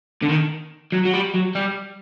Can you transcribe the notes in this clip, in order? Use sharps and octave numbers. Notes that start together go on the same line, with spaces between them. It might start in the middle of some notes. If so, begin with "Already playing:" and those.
D3
D#3
F#3
F#3
G3
F#3
G3